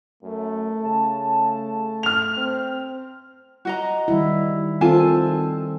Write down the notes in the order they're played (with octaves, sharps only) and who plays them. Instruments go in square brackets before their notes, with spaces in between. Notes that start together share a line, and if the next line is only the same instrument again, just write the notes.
[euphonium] F#2 [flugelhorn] A3
[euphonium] C#3 [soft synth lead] A5
[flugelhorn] A3
[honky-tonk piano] F6 F7
[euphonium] C4
[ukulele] F#4 D#5 A#5
[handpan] D#3 G3 E4
[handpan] D#3 C4 A4 [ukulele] F4 G#5 A5